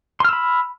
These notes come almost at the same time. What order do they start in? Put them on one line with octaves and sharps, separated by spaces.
C6 F6 E6 B5